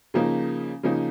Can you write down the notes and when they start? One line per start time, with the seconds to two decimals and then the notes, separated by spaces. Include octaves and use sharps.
0.14 C#3 F3 A#3 D#4
0.83 C#3 F3 A#3 D#4